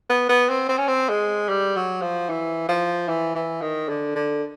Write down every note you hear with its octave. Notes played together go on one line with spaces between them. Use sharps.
B3
B3
C4
C4
C#4
C4
G#3
G3
F#3
F3
E3
F3
E3
E3
D#3
D3
D3